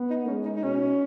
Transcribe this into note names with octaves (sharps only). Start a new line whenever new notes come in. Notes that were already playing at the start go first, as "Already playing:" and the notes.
Already playing: B3
D#4
G#3 C#4
D#4
D#4
B2 C#4